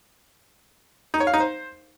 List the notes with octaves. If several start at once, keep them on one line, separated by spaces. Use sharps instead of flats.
D#4
C#5
F5
D#4
C5